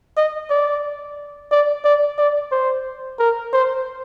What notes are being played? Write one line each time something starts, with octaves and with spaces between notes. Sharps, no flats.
D#5
D5
D5
D5
D5
C5
A#4
C5